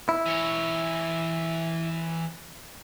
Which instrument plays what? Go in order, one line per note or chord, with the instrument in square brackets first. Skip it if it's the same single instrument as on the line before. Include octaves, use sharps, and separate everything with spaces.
[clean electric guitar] E4
[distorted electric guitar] E3 C#5